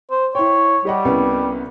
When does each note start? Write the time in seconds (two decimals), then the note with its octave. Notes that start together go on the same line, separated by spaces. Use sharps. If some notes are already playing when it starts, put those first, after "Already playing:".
0.11 C5
0.35 E4 C#5 G5
0.85 G3 G4 D#5 F#5
1.05 C2 B3 C#4